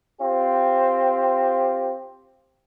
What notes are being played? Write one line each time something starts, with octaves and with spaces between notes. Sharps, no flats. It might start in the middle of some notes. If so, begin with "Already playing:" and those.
C4 F4 G4